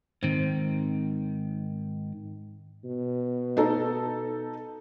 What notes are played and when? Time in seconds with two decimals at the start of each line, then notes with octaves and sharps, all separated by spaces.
0.23 G#2 D#3 C4
2.84 B2
3.57 D#4 A4